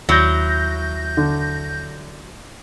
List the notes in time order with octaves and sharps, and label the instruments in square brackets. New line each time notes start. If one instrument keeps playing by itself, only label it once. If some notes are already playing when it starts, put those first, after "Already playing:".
[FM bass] D#2 [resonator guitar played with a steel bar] F#3 E4 [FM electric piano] G6 A#6
[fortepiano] D3